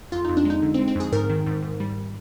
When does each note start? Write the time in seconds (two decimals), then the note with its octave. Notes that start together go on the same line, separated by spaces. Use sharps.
0.12 F2 F4
0.24 D#4
0.29 F2
0.37 D4
0.45 G#3 D#4
0.62 D3
0.74 C4
0.79 G#3
0.88 C4
0.95 F2 G#4
1.12 G#2 A#4
1.30 D#3
1.46 G#2
1.62 G#2
1.80 G3